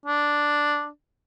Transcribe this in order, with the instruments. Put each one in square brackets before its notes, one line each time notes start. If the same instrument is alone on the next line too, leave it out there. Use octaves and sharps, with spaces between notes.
[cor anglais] D4